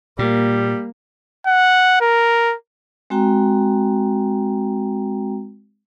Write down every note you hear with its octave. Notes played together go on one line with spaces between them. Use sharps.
A#2 G3 A#3
F#5
A#4
G#3 C4 F#4 G5 A#5